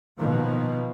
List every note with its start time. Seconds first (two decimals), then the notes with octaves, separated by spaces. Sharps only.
0.19 B2 D#3 F3 A#3